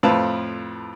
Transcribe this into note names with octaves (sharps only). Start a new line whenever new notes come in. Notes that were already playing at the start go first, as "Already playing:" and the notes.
F2 A2 C4 F4 B4 A5